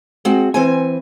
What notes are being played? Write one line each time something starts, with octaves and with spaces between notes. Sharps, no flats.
G#3 C4 F#4
E3 C4 G#5